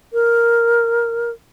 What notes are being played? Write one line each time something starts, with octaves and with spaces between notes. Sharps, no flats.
A#4